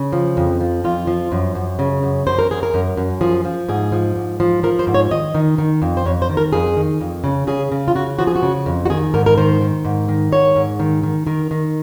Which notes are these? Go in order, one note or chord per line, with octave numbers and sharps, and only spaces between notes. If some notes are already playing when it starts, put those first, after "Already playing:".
Already playing: C#3
F3
F2
F3
F2 F4
F3
F#2
F#2
C#3
F#2
F#2 C5
A#4
F#2 G#4
A#4
F#2
F#2
F3 G#4
F3
G#2 G#4
F3
G#2
F3
F3 A#4
C5
G#2
C#5
D#3 D#5
D#3
D#3
F2
C5
F2 C#5
C5
D#3
A#4
F2 G#4
D#3
F2
C#3
C#3 G#4
C#3
F4
C#3 F#4
F3 F#4
G#4
F#4
C#3
F2
F#4
D#3 G#4
G#2 A#4
A#4
D#3 C5
D#3
G#2
D#3
G#2 C#5
G#2
D#3
D#3
D#3 A#4
D#3